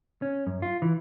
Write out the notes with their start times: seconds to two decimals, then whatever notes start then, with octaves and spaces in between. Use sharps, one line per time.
0.22 C#4
0.47 F#2
0.62 F4
0.82 E3